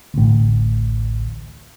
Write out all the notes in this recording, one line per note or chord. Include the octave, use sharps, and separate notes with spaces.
A1 D2